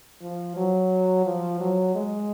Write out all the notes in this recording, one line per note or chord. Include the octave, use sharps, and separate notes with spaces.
F3
F#3
F3
F#3
G#3